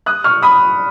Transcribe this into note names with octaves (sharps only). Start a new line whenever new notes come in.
D#6 F#6
C#6 F6
B5 D#6